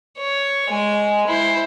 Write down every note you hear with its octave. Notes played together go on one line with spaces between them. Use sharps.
C#5
G#3 G#5
E4 C5